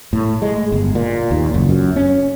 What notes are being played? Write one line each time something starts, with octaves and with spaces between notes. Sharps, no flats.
A2
G#3
G1
A#2
D#2
F#1
F#2
C#4